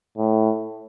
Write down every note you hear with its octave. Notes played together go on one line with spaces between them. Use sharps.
A2